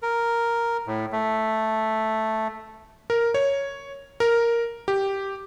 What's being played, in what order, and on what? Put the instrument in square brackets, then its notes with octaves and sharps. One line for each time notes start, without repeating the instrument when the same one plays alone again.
[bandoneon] A#4
A2
A3
[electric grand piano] A#4
C#5
A#4
G4